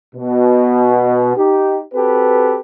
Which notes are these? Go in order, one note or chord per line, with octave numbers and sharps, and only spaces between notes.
B2
D#4 G4
C4 F#4 G4 A4 B4